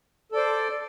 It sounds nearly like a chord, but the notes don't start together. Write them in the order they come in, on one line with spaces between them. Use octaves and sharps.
A4 D5 C5